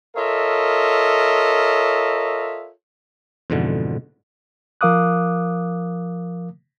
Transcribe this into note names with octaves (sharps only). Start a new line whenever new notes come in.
F4 A4 A#4 C#5 D#5 E5
F2 G#2 B2 D3 E3
F3 A#4 F5 D6 D#6 F#6